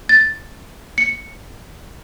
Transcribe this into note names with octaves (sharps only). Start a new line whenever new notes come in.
A6
C#7